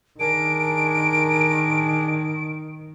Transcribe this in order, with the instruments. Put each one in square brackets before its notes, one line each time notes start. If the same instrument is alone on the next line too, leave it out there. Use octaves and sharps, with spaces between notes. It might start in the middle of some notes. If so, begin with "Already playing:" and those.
[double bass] D#3 [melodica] D4 G#4 [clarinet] A#4 [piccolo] D7